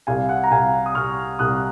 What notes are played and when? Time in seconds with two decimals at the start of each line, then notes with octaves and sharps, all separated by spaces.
0.07 C2 F5 G#5
0.29 F#5
0.44 A#5
0.51 C2 F5 G#5
0.86 D#6
0.95 C2 C#6 F6
1.39 C2 D#6 F#6